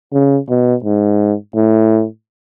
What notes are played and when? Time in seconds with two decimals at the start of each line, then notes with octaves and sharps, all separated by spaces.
0.13 C#3
0.50 B2
0.85 G#2
1.56 A2